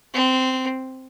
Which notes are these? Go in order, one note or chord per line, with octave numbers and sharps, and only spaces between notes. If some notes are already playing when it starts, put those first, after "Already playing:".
C4